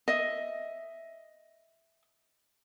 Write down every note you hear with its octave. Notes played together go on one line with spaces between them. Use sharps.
D#5 E5